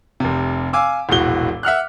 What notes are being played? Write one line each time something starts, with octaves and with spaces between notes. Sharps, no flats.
F1 C3
F5 G#5 D6 E6
E1 A#1 A2 F#4 G7
E5 F#5 F6 F#6